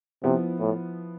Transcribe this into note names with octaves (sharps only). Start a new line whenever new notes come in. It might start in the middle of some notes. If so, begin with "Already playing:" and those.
C3 F3 B3 E4
A2